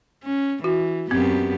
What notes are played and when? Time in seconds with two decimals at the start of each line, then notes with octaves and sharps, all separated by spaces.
0.24 C#4
0.64 E3 F#4
1.11 F#2 B3 C4 G4